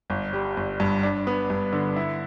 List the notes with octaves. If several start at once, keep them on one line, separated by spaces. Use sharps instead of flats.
G1
G3
G1
G2
D4
B3
G2
D3
E4